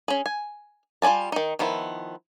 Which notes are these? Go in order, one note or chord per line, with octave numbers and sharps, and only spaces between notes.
C#4 G#4
G#5
G3 F4 D5 G#5 A5
D#3 D#4
D#3 F3 B3 E4